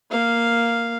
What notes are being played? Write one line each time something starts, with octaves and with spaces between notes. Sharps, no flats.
A#3 F5